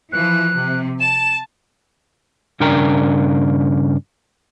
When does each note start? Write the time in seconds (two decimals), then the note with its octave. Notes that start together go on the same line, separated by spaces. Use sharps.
0.12 E3 F3 F#6
0.53 C3
1.00 A5 E7
2.60 G2 C#3 D4 A#4 G5 A#5